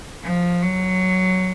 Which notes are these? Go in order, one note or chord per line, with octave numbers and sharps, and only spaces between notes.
F3
F#3